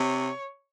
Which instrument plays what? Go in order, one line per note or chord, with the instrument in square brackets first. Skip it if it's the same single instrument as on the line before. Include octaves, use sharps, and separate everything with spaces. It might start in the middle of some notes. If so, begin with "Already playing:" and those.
Already playing: [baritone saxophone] C3 [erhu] C#5